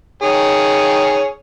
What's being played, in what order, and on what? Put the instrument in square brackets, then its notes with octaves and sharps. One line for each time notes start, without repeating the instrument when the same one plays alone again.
[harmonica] D#3 G#4 C#5